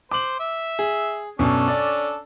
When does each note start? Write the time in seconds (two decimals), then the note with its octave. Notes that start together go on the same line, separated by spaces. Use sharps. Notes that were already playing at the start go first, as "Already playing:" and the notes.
0.11 C5 D6 F#7
0.40 E5
0.79 G#4
1.39 F#2 B2 C#4 D4 A4
1.68 D5